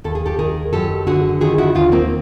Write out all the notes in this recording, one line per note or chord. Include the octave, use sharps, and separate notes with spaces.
D#2 A4
G#4
G4 A4
D#3 G#4 A#4
F#2 G4 A4
D3 F#4 G#4
D#3 F#4 G#4
E4 F#4
D#2 D#4 F4
A#3 C4